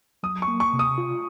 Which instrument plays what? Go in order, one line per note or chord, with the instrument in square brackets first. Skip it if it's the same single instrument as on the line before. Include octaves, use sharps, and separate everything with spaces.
[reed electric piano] F#3 [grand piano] D#6
[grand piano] C#6
[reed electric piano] A#3
[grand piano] C#6
[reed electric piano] C3
[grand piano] D#6
[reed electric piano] F4